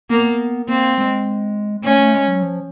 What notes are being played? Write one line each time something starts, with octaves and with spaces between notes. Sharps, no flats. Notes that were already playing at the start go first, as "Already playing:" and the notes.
A#3 B3
A#3 C4
G#3
A3 C#4
A3
G#3
F#3
F3